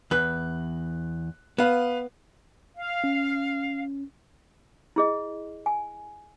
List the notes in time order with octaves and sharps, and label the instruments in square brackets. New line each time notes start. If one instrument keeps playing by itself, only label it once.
[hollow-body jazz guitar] E2 B4 [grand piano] F#6
[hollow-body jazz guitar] B3 [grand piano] B4 F5
[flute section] F5
[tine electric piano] C#4
[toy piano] E4 G#4 D#5
G#5